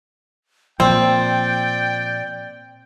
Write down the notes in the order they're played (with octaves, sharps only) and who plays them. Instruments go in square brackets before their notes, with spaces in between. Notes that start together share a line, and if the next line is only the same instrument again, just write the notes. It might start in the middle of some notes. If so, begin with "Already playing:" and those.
[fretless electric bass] A#2 F3 [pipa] C4 [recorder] D5 [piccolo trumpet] G5